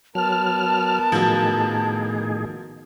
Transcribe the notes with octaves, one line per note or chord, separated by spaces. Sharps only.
F#3 B3 A#4 A5 F6
A2 D#3 F3 F#3 G#4